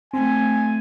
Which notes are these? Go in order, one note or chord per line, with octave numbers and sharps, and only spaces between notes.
A3 C4 G#5